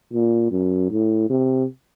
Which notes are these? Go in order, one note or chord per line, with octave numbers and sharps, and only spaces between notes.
A#2
F#2
A2
C3